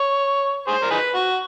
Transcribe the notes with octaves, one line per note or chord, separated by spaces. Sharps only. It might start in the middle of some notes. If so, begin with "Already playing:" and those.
Already playing: C#5
G#4 C5
A#4
D#4 G#4 B4
F#4